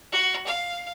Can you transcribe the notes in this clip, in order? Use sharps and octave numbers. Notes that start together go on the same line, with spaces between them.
F#4
F5